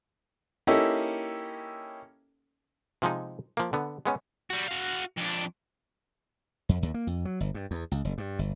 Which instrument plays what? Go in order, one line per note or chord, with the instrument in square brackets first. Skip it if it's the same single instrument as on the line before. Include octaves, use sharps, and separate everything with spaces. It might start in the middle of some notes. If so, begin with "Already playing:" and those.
[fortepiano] A#3 C#4 D#4 E4 G4 A4
[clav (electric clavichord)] C3 F3 G#3 D#4
F3 A#3
D3 B3
G#3 B3 C#4
[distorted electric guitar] G3 F#4
F#4 F5
F2 D4
[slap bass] F2
D#2
A#3
F2
F#3
G1
G2
E2
C#2
F#1
G2
G1